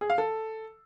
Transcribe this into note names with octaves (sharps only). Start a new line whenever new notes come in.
G#4
F5
A4